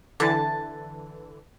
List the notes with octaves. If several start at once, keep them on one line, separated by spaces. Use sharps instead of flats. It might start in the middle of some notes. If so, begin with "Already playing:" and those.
D3 E3 A5